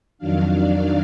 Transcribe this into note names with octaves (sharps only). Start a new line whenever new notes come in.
F2 D#3 F#3 D4 F5
D5